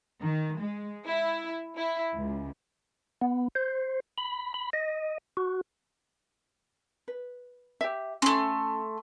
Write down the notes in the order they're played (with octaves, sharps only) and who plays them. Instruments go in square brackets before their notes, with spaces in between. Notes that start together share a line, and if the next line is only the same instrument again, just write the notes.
[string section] D#3
G#3
E4
E4
C#2
[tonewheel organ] B3
C5
B5
B5
D#5
F#4
[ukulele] B4
G4 E5
[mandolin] A3 C6 [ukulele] C#4 B5